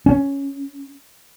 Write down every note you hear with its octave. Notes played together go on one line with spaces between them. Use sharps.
C#4